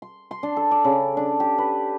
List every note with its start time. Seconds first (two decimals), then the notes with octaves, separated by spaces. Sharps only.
0.02 C6
0.31 C6
0.43 D4
0.57 A4
0.71 D5
0.85 C#3
1.17 D4
1.40 G4
1.58 B4